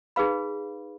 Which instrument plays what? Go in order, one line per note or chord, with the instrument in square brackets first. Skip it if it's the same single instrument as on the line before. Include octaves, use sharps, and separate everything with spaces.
[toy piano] D#4 G#4 B4 F5 B5